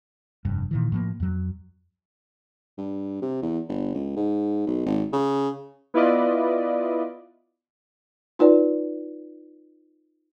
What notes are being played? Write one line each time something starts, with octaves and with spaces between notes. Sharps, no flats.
F1 G2
A#2 D#3 E3
A2 F3 A#3
F2 F#3
G2
C3
E2
G1
C#2
G#2
B1
G#1
C#3
B3 E4 F4 B4 D5 D#5
D#4 F4 B4 D5